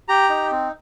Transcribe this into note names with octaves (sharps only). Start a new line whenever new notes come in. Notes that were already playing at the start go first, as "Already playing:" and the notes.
G4 A#5
D#4
C4